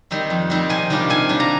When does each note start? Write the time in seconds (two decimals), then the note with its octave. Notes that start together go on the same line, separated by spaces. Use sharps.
0.11 D#3 G3 C4 D#4
0.30 F2
0.50 D#3 G3 C4 D#4
0.69 C3 G#5
0.90 D#3 G3 D4 F4
1.10 C3 G#5
1.29 D#3 G3 D4 F4
1.40 A#5